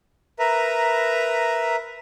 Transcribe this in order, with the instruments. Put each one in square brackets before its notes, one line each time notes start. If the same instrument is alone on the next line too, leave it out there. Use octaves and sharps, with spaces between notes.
[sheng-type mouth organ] A#4 B4 E5 A#5